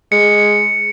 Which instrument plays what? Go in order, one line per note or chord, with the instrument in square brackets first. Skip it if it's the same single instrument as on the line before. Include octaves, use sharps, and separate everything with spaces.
[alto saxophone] G#3 [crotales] C#7